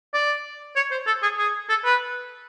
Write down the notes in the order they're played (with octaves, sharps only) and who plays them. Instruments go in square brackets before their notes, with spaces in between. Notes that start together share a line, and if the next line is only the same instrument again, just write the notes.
[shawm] D5
C#5
C5
A4
G#4
G#4
A4
B4